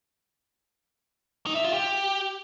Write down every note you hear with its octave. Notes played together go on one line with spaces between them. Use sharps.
D#4
E5
F4
G4